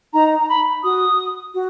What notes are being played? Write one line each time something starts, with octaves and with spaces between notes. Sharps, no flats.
D#4 A#5
A#5
B5
F#4 D#6
F#4